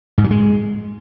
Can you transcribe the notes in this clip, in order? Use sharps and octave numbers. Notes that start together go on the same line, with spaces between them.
G#2
F#3
G#3